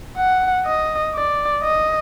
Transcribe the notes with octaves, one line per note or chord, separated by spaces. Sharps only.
F#5
D#5
D5
D#5